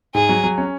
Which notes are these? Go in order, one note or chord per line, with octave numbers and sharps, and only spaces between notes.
G#2 G#4
F#3
F#3
C#4